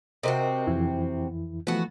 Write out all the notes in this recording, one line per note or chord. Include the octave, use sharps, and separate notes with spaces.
C3 C4 F#4 A#4 C5 D#5
F2 E3 E4
E3 F3 A3 B3 F#4